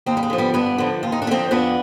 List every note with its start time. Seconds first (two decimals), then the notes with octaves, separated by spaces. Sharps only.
0.06 D#2 C4 D#4
0.17 G3
0.23 G#3
0.30 D3 F3
0.38 G3 B3
0.54 G2 B3 D4
0.78 D3 F3
1.03 D#2 F4
1.12 D#4
1.22 D4
1.27 D3 F3 C4 D#4
1.51 F2 B3 D4